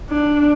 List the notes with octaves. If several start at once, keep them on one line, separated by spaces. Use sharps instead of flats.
D4